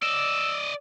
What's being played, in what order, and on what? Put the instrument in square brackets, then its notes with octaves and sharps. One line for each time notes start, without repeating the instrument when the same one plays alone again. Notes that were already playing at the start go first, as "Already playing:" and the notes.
[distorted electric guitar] D5 D#5 [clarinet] E6